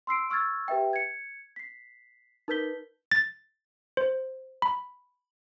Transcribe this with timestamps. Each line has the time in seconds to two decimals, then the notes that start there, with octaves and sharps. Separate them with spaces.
0.07 C6 E6 C7 D7
0.30 C#6 E6 F6 G#6 A6
0.68 G4 B4 E5 G5
0.93 G#6 C#7
1.56 B6 C7
2.48 D#4 A#4 B4 G6 B6 G7
3.12 A6
3.97 C5
4.62 B5